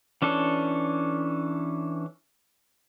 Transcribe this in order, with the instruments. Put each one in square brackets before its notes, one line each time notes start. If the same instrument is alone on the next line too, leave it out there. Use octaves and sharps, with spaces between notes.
[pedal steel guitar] E3 C#4 D4 A4